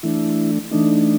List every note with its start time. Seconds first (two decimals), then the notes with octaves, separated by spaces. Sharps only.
0.03 E3 A3 D4 E4
0.71 E3 A3 D4 D#4